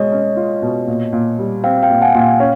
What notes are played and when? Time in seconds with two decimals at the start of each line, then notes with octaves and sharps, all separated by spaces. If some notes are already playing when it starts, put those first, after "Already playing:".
Already playing: B2 G#3 C#5 D#5
0.12 C#4
0.37 F4
0.62 B2
0.87 A#2
1.13 A#2
1.39 G3
1.64 C4 F5 G5
1.83 F5 G5
1.90 A#2
2.02 F#5 G#5
2.14 A#2
2.21 F5 G5
2.40 C#4